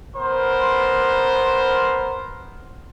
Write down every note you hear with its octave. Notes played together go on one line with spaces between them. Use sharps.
B3 A#4 C5